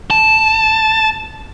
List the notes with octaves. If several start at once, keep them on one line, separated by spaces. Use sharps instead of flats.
A5